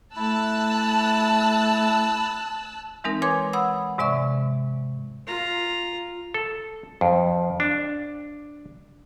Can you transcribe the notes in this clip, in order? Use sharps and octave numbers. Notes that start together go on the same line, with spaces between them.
A3 E4 A5 E6 F#6
E3 G#3 C4 D#4 A#4
B4 C#5 G#5 C6 D6 G#6
F#5 B5 D#6 E6
G#2 C3 G#3 D5 E5 C#6
F4 A#5
A4
F2
D4